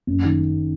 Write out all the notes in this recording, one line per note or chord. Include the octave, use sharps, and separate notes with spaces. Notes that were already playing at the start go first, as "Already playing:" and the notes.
F#1
D#3